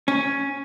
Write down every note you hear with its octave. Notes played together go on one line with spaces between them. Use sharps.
C#4